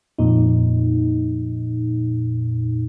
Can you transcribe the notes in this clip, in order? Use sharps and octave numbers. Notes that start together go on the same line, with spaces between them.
F2 A#2 D#4